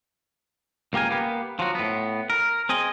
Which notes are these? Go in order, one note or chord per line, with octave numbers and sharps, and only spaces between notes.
C#2 A#3 G4 A#4 G#5
A#3 B3 G4 B4
F3 F#3 F#4
A2 B3
A#4
C4 G#4 D#5